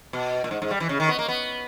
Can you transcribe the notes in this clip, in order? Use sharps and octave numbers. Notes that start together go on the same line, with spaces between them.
B2
A#2
G#2
G#2
G3
E3
C#3
D#3
B3
A#3
B3